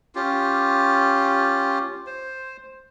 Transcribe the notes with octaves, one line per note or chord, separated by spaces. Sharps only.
C#4 F4 G4
C5